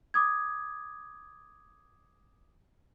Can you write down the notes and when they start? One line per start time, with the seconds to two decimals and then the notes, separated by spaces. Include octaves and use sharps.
0.14 D6 D#6 G#6